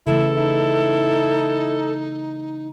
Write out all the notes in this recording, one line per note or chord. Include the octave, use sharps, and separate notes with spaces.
C#3 E3 A3 E4 A4
D#4 E4